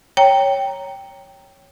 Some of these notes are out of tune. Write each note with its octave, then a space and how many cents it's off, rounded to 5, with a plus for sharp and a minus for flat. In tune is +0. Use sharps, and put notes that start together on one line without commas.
C#5 +0 G5 +0 A#5 +0